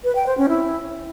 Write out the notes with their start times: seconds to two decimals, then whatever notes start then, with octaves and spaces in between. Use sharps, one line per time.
0.04 B4
0.15 G5
0.26 C5
0.38 C#4
0.49 E4